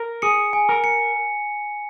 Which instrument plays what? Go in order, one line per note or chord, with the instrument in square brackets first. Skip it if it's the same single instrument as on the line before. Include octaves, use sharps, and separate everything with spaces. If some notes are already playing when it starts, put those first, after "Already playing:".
Already playing: [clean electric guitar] A#4
[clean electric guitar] G#4 [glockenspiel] C#7
[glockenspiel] G#5
[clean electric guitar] A#4
[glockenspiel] C#7